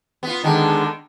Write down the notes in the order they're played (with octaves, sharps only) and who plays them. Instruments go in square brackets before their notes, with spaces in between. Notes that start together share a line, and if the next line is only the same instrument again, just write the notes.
[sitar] B3 F4
[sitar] D3 D#3 [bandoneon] G#3 B3 D4